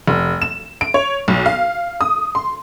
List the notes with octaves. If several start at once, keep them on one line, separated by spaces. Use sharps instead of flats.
F1
E7
D7
C#5
B1
F5
D#6
C6